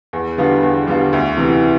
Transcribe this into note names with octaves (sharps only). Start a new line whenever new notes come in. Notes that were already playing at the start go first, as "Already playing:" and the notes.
E2
D3 G3 B3 F4
E2
D3 G3 B3 F4
D2
C3 E3